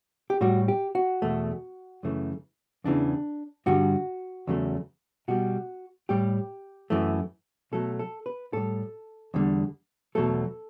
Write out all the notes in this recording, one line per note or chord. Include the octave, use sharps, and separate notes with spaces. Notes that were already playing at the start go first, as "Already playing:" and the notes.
G4
A2 G3 F#4
G4
F#4
E2 B2 A3
F#2 C#3 E3 A3
E2 C#3 E3 D4
G2 D3 G3 F#4
E2 C#3 F#3 A3
B2 G3 F#4
A2 G3 G4
F#2 E3 A3
B2 F#3 A3 A4
A4
B4
A2 G3 A4
E2 D3 G3
E2 B2 F#3 A3 A4